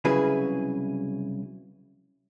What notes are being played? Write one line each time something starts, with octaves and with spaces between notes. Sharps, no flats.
C2 C#3 F#3 E4 G#4 B4